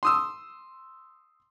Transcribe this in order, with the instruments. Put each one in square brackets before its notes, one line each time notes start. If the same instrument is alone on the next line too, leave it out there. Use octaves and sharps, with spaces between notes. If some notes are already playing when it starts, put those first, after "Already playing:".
[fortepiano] C6 D#6 E6